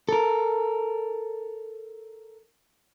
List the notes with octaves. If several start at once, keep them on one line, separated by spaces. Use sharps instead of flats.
A4 A#4